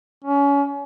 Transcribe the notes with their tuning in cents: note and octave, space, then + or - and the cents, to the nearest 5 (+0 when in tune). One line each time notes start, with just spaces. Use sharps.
C#4 +30